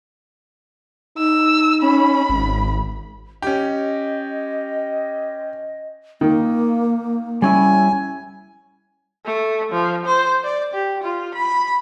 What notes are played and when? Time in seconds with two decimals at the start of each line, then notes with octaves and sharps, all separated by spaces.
1.18 D#4 E6
1.82 C#4 B5
2.29 G#1
3.42 C#4 G4 D#5
6.21 D#3 A#3
7.42 G3 C#4 E4 G#5
9.26 A3
9.72 F3
10.06 C5
10.44 D5
10.74 G4
11.03 F4
11.35 B5